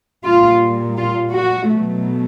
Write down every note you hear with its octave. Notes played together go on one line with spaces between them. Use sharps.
A#2 G3 F4
F4
F#4
B2 F#3 A3